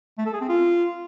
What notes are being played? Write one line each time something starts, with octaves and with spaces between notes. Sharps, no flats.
A3
A4
G#4
C4
F4